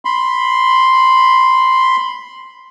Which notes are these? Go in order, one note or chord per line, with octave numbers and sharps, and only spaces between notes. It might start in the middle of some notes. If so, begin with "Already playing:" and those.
B5 C6